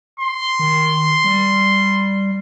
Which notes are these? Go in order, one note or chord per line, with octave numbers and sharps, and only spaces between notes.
C6
D#3
G3